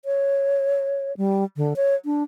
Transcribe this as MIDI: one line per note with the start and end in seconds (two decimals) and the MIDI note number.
0.05 1.15 73
1.17 1.44 55
1.57 1.74 50
1.76 1.95 73
2.05 2.23 62